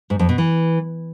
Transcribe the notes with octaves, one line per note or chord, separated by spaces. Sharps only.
G#2
F2
B2
E3